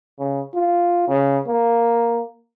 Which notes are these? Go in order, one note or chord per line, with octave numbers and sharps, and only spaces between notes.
C#3
F4
C#3
A#3